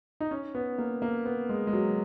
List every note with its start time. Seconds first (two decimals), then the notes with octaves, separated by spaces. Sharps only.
0.20 D#4
0.31 C#4
0.55 B3
0.78 A#3
1.02 A#3
1.25 B3
1.49 G#3
1.67 G#3
1.73 F#3